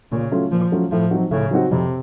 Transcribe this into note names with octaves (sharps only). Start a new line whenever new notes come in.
A#2 C#3
F#3 A3 C#4 F4
A#2 F3
F#3 A3 C#4 F4
A2 F3
F#3 C4 D#4 F#4
A2 C#3
F#3 C4 D#4 F#4
F2 C3